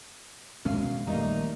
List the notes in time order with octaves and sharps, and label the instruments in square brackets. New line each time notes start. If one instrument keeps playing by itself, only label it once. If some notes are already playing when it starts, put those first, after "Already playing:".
[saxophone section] F#2 F5 [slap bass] B2 G#3 C#4
[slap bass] A#1 D#2 [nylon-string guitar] G3 A3 A#3 [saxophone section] D#4